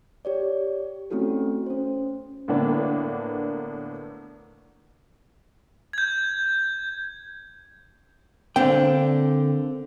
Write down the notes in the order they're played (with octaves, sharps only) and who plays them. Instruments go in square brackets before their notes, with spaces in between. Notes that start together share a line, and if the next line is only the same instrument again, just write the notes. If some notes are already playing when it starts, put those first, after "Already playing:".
[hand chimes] G4 C#5 D5
A3 C4 C#4 E4 F#4 A4
C#4 C5
[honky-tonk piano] A2 D3 A#3 B3 D4
[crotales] G6 G#6
[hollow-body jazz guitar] D3 G5 [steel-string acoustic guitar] A#3 C4 D4